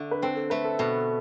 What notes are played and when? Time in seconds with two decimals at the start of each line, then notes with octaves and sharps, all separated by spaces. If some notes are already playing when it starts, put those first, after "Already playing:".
Already playing: D3 A3
0.11 B4
0.22 C4 A4
0.36 A4
0.50 A3 B4
0.64 A4
0.79 B2 A4